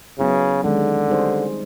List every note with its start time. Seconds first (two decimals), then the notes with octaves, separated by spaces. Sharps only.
0.19 C#3 F#3 B3 E4 G#4
0.63 D3 D#3 G#3 C#4
1.09 G3 C4 D#4 G#4 C5